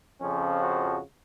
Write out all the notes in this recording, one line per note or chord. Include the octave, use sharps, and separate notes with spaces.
F2 C#3 F3 C#4
F#4